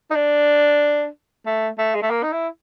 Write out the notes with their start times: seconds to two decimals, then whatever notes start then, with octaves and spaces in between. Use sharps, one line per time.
0.11 D#4
0.15 D4
1.46 A3
1.78 A3
1.95 G#3
2.02 A3
2.10 A#3
2.23 D#4
2.32 E4